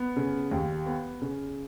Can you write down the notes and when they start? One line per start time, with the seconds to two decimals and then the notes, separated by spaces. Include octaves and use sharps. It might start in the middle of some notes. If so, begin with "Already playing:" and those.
Already playing: B3
0.16 C#3
0.51 D#2
0.86 B3
1.22 C#3